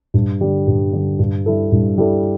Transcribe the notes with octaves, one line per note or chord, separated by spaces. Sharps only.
G2
D3 G3
G2
D3 G3
G2
G3 E4 A4
G2
G3 E4 A4